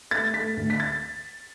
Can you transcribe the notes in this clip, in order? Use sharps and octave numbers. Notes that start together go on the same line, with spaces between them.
A3 A6
A3 B6
D2
B6
A6